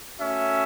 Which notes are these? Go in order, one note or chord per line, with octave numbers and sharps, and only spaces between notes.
A3 C#4 F#4 E5